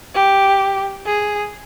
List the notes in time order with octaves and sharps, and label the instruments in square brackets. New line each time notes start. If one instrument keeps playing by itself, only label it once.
[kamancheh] G4
G#4